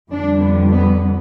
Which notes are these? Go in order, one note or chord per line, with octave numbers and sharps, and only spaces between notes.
F2 D3 G3 D4
B3
B3